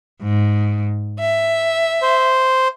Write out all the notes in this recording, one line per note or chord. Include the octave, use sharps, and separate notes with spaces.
G#2
E5
C5